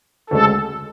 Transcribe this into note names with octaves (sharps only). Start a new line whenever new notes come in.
D2 C#3 G#3 A4